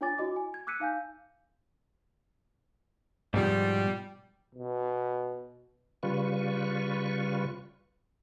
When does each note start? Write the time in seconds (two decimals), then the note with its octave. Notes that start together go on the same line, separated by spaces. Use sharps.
0.01 D4 F4 C#5 G#5 D6 A6
0.18 E4 F#4 D#5 D6
0.36 G#5
0.54 G#6
0.67 D6 E6 F#6 B6 C#7 D#7
0.80 D#4 F5 G#5 G6
3.34 G#2 B2 F3 G3
4.55 B2
6.03 C#3 G3 F4 B4 C#6